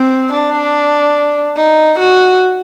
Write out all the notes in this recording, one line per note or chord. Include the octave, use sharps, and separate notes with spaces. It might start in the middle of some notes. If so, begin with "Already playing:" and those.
Already playing: C4
D4
D#4
F#4